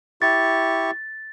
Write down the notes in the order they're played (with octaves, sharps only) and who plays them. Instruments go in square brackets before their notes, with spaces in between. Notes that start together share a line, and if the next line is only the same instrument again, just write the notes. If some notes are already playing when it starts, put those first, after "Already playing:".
[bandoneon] E4 G4 C#6 [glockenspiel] A6